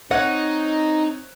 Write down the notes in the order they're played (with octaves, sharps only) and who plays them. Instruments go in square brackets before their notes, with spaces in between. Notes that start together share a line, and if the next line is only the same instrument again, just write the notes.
[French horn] C4 [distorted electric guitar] D#4 [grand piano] C#5 F#6 G#6 [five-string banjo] F#5